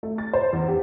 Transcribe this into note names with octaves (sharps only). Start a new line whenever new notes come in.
A3
A6
C5
E2
G4